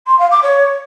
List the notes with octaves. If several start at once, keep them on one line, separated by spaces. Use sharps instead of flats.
C6
F5
D6
C#5